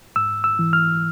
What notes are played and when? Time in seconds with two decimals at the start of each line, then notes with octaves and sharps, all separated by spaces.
0.16 G#2 E6
0.44 E6
0.59 E3
0.73 F6